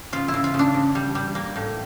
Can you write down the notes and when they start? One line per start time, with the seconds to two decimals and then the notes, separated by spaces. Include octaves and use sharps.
0.13 C#3 F4
0.28 E4
0.34 C#3
0.44 F4
0.54 C#3
0.59 D4
0.74 C#3
0.95 G3
1.15 G3
1.35 A#3
1.56 A2